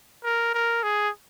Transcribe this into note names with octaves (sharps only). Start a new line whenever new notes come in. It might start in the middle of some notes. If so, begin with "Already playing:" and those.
A#4
A#4
G#4